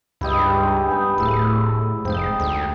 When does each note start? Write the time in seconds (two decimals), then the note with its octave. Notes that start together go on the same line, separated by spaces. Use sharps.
0.21 C#2 G2 E4 G4 D#5
0.90 B3 D#4
1.18 D1 A2 G#4 E5
2.05 F1 G#2 C4 D#4
2.40 D2